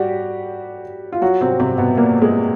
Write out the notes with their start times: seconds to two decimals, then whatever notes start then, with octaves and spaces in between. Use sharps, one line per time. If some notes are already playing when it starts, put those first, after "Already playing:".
Already playing: G3 F#4 G4
1.12 F4
1.22 F#3 F#4
1.41 C3 C4
1.60 C3 C4
1.78 B2 B3
1.97 A#2 A#3
2.22 G#3